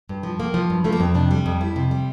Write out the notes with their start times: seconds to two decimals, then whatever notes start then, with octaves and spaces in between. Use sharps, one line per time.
0.09 G2
0.23 F3
0.39 G2 A#3
0.54 F3
0.70 G2
0.84 F3 A3
0.93 A#3
1.00 F2 C4
1.14 C3 D4
1.31 G3
1.46 F2
1.61 F2 E4
1.76 C3
1.91 G3